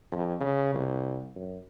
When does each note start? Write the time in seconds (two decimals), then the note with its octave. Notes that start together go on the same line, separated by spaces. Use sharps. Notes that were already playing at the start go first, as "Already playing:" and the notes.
0.12 F2
0.40 C#3
0.74 C2
1.36 F#2